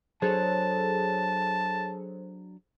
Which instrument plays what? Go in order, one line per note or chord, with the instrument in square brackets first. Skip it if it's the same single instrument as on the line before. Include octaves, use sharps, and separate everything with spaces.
[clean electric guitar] F#3 D4 [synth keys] G#4 A4 C#5 [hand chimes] C5 [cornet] A5